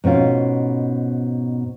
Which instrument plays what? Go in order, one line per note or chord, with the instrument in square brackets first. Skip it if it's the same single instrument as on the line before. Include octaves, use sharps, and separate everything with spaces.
[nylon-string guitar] G#2 B2 C#4 F4